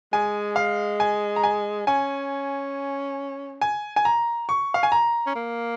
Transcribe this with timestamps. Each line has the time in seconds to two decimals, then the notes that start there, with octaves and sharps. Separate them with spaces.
0.13 G#3 G#5
0.56 F5
1.00 G#5
1.36 A#5
1.44 G#5
1.87 C#4 G#5
3.61 G#5
3.96 G#5
4.05 A#5
4.49 C#6
4.74 F5
4.83 G#5
4.92 A#5
5.26 C#4
5.35 A#3